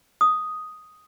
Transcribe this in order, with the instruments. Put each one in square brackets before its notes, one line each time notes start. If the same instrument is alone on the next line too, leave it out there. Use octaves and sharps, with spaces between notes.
[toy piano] D#6